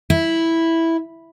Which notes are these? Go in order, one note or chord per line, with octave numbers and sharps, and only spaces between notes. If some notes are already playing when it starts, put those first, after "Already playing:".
E4